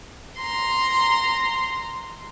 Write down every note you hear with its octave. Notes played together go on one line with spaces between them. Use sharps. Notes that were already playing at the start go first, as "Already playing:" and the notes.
A#5 C6